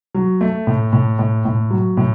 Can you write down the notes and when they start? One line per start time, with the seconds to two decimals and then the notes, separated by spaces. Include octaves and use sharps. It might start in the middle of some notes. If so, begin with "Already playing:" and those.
0.14 F#3
0.41 A3
0.67 A2
0.93 A2
1.19 A2
1.45 A2
1.71 F#3
1.97 A2